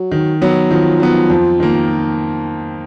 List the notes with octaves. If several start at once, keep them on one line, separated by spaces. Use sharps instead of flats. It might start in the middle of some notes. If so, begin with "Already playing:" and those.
Already playing: F#3
D#3
F#3 B3
D#3 F3
F#3 B3
F2
D#3 A#3